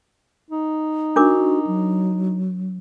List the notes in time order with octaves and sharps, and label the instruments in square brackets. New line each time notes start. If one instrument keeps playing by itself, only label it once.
[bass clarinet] D#4
[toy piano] D4 A#4 D6 [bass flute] F#4
[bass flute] F#3